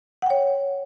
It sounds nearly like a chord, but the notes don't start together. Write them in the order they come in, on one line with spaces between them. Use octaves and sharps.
F#5 G5 C#5